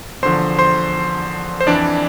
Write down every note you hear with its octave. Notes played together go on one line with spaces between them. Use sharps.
E2 D3 F3 C5 C6
C5 C6
C5
F2 E3 D4 D5